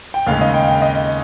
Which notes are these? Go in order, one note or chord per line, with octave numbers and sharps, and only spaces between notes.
G5
D#2 C#3 G#3 F5
D#5
G5
G5
D#5